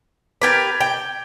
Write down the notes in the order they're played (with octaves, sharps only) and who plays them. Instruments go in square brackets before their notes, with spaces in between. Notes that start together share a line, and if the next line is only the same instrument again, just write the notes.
[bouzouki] G4 A#4 B4 [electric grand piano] D6 G#6 A6
[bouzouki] G5